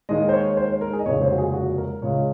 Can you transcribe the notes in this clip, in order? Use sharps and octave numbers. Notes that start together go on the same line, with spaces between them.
D#2 D#3 G#3 D#5
C5
C#5
C5
C5
A#4
G#4
D#5
F1 D#2 C#3 G#3 C#5
C5
F#4
G#4
F#4
A#4
C#2 C#3 G#3 C#5